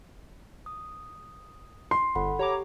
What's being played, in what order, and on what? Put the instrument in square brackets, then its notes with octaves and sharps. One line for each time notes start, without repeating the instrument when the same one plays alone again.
[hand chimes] D#6
[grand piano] C6
[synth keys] G1 [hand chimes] A4 F#5 B5
[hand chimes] G4 [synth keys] C#5 A#5 D6